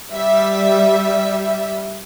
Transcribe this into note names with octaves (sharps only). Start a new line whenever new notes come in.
G3 E5